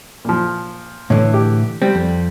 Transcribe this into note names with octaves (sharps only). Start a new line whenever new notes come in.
A#2 F3
A2 D3 E3 C#5
G4
G3 C4
F2